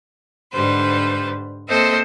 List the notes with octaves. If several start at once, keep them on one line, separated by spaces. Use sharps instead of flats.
G#2 D3 G3 B4 C5
A#3 C4 A4 C5 D#5 E5